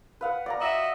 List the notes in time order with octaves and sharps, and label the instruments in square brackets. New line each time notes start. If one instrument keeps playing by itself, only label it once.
[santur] B4 F5 F#5
D5 F5 A#5
[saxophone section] F#4 D#5 E5